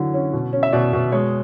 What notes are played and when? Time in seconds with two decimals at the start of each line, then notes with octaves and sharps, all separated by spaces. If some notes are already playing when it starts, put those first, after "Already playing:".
Already playing: D3 E3 F#3
0.14 C#4
0.33 B2
0.53 C#4
0.63 E5
0.73 B2 D5
0.93 B2
1.12 G#3 C#5